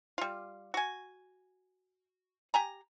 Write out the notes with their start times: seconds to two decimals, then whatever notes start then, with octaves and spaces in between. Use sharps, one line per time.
0.18 G3 F4
0.74 F#4 G#5
2.54 G4 G#5 A#5